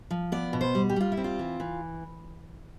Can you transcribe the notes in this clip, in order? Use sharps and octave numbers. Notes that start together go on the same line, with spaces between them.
F3
B3 D5
B2
C5
G3
G4
G3 F4
E4
C4
F4
E3
E3